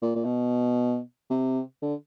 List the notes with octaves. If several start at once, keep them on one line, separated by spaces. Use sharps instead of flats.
A#2
A#2
B2
C3
D3